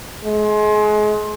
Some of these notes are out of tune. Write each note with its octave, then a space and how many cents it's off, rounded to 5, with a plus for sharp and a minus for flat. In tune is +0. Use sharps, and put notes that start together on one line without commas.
G#3 +30